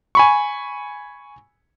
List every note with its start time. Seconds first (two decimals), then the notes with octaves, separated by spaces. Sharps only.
0.15 G#5 B5 C#6